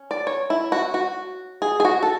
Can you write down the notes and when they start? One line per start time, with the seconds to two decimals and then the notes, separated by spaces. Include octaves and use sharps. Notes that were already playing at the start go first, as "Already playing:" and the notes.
Already playing: C#4
0.11 D5
0.27 C#5
0.50 E4
0.72 F#4
0.94 F#4
1.62 G#4
1.80 G#4
1.85 F#4
2.03 A4